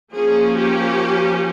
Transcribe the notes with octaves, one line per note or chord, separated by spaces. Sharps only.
F3 A#3 C#4 G#4
G4